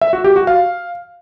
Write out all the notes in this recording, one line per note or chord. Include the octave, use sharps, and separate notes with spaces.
E5
F#4
G4
F#4
F5